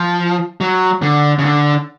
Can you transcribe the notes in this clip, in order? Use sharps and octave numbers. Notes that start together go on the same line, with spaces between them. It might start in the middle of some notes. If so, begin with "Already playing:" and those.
Already playing: F3
F#3
D3
C#3
D3